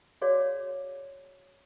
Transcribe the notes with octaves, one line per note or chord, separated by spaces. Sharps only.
F#4 G#4 C#5 D5 F5